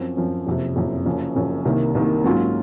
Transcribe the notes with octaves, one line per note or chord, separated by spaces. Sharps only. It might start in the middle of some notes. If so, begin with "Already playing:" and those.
Already playing: F#2 F3 C4
F#2 F3 C4
F#1 F2 C3
F#1 F2 C3
F#1 F#2 F3
F#1 F#2 F3
C2 C3 D#3 A#3
C2 C3 D#3 A#3
G#2 F#3 A#3 C#4 F4